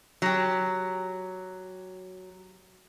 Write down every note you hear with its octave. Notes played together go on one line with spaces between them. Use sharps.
F#3 G4